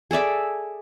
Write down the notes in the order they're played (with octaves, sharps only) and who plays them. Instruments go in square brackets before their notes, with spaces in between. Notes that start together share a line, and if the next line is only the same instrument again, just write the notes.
[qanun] G#4 A4 D5 E5